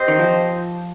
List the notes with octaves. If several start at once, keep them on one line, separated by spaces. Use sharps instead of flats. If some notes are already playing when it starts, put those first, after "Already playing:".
Already playing: C4 G4 C5 D#5
D#3
F3